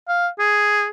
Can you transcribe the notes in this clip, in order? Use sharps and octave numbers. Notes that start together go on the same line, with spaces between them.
F5
G#4